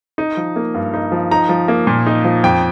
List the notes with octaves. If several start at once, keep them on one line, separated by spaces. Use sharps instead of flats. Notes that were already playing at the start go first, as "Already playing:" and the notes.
D#4
F3
A#3
G2
D#4
F3
D#4 A#5
F3
A#3
A#2
D#4
F3
F2 G5